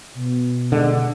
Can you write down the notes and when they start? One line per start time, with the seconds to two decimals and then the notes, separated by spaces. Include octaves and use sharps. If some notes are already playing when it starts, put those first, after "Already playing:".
0.14 B2
0.72 D3 G#3